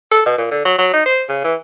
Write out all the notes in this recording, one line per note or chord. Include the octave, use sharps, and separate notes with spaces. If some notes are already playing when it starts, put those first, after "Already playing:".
A4
B2
A#2
D3
F#3
F#3
D#4
C5
C#3
E3